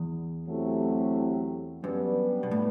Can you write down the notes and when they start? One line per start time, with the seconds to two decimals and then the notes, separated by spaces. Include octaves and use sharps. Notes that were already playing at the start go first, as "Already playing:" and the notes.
Already playing: E2
0.47 F#3 A3 C4 E4 G4
1.84 F#2 G3 B3 D4 G4 B4
2.43 B2
2.51 A2